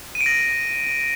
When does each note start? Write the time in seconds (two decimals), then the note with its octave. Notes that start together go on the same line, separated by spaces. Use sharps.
0.15 D#7
0.21 D7
0.26 A#6